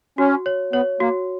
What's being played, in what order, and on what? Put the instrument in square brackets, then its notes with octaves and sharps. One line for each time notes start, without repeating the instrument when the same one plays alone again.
[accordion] C#4 [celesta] F#4
[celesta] C#5
[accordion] B3 [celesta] C#5
[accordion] A#3 [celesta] F#4